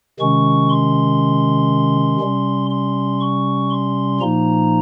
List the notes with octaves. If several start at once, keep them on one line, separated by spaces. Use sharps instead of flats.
C3 D#3 G#3 C#4 C#6
C6
C3 G3 C#4
C6
C#6
C6
A#2 F3 A#3 D#4 A#5